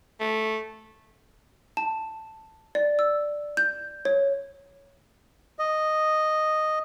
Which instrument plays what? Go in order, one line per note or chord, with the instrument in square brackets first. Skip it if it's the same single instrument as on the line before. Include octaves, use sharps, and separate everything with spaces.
[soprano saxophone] A3
[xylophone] A5
D5
E6
G6
C#5
[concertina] D#5